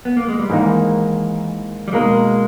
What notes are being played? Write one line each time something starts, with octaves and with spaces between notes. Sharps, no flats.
B3
A#3
G#3
G3
G#2 D#3 E3 A#3 D#4
G3
B2 G#3 A#3 D#4 A#4